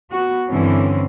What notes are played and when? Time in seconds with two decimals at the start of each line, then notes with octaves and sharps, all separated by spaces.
0.10 B3 F#4
0.49 G2 D3 E3 C4 C#4